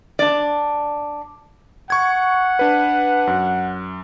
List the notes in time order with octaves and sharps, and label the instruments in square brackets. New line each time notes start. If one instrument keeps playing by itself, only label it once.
[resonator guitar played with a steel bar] D4 D5
[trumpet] F#5 [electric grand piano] C#6 G#6
[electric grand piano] D4 B4
F#2